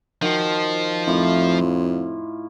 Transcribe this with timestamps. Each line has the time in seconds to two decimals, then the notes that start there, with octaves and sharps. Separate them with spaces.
0.22 D#3 F3 F#4
1.07 F2 A2 E4 F4